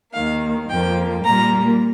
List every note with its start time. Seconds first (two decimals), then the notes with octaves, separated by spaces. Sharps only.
0.13 D#2 D#3 A#3 F5
0.69 F2 F3 A#3 G5
1.24 A#2 G3 A#3 A#5